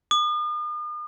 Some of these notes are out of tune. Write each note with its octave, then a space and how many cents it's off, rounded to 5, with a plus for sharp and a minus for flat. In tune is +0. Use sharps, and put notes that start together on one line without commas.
D#6 -45